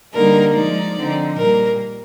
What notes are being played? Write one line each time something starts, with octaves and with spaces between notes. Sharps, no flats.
D3 G3 A#3 D#4 A#4
F3 G#3 D#4 D5
D3 F3 C4 D#4
A#2 G3 A#3 A#4